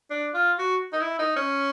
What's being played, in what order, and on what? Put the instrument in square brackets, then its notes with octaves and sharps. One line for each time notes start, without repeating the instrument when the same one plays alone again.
[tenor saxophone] D4
F4
F#4
D#4
E4
D#4
C#4